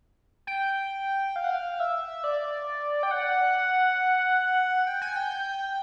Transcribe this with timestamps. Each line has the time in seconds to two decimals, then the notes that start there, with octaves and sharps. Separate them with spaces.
0.47 G5
1.36 F5
1.44 F#5
1.51 F5
1.80 E5
2.24 D5
3.03 G5
3.11 F#5
4.87 G5
5.02 G#5
5.16 G5